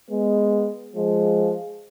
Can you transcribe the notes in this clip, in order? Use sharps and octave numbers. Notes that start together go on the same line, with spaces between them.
G#3 B3
F3 G#3